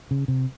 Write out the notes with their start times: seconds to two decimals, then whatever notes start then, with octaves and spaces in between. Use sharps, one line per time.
0.11 C#3
0.28 C3